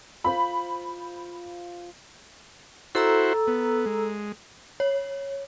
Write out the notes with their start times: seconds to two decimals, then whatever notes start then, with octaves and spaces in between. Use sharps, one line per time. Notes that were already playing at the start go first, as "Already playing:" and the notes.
0.24 F4 C5 B5
2.95 E4 F#4 A4 C5 A#5 E6
3.47 B3
3.86 G#3
4.80 C#5